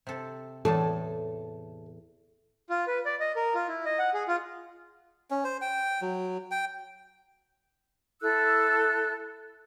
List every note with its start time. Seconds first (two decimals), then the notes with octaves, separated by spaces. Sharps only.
0.07 C3 A4
0.65 E2 A2 A4 A5
2.70 F4
2.87 B4
3.05 D5
3.20 D#5
3.36 A#4
3.55 F4
3.68 E4
3.86 D#5
3.99 F#5
4.14 G#4
4.28 F4
5.30 C#4
5.44 C5
5.61 G5
6.01 F#3
6.51 G5
8.22 E4 A4 E6 F#6